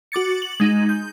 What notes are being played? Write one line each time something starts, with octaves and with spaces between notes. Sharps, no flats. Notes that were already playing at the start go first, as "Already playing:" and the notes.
F#4 D6 A6 C#7
F#7
G#3 D#4
G6